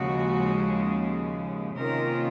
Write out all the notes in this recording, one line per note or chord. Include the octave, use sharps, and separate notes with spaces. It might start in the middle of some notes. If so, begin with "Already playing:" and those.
Already playing: D#2 C#3 F3 G#3 F#4
C3 D#3 A#3 C#4 F4 A#4